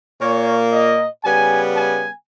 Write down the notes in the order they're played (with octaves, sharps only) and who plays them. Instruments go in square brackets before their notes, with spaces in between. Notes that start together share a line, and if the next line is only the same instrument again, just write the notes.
[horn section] A#2 A#3 C#5
D#5
C#3 G3 B3 G#5
G#5